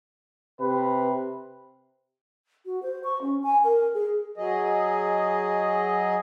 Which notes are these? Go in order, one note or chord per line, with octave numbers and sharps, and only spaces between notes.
C3 B4
F#4
C5
C#6
C#4
G#5
A#4
G#4
F#3 G#4 D#5